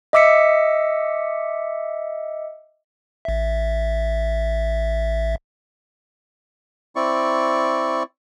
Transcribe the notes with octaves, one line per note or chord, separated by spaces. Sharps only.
D#5 E5 D6 E6 B6 C#7
A1 E5
C4 E4 D5 C#6